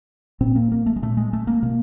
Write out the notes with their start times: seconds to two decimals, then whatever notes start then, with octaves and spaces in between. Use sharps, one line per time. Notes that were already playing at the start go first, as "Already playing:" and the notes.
0.41 A#2 C4
0.56 A#3
0.72 A#3
0.86 A3
0.96 G#3
1.02 A#2 A3
1.17 G#3
1.33 A3
1.47 A#3
1.62 B2 A#3